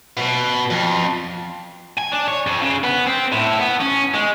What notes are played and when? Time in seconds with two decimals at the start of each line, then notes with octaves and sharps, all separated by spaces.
0.17 B2
0.70 F2
1.98 G#5
2.12 D4
2.28 C#5
2.47 F2
2.62 C#3
2.84 B3
3.07 C4
3.32 A2
3.59 B3
3.81 C#4
4.14 G#3